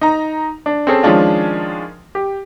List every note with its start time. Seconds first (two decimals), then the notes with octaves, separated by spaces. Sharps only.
0.01 D#4 A#5
0.66 D4
0.87 C4 C#4 G#4 A4 C5
1.03 D#3 F3 G#3 C#4 D4 F4
2.15 G4